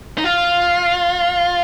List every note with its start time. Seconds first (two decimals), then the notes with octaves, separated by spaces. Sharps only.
0.18 D#4
0.24 F4